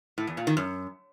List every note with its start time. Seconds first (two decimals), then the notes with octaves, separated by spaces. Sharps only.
0.18 A2
0.27 E2
0.37 A#2
0.47 D#3
0.57 F#2